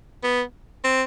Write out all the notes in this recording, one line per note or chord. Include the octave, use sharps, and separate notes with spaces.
B3
C4